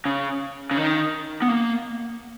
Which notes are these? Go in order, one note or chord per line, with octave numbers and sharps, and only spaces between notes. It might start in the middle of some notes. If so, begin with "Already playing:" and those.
C#3
C#3
D#3
B3
A#3